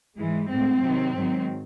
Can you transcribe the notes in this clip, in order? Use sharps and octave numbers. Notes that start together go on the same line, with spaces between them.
G#2 E3 G#3
A2 G#3 C4
C3 D#3 F#3
G#2 D#3 F#3